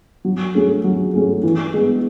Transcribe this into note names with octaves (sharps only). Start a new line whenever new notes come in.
F#3
A3 C#4 G#4
F#3
A3 C#4 G#4
E3
G#3 B3